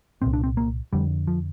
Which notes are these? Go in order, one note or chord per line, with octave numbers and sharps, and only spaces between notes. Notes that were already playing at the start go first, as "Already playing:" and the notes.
C2 A#2 C4
D4
C4
A#3
F2 D3 G3
F3